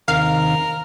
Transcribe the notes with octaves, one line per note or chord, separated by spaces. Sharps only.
D#2 C3 D#3 A#4 F5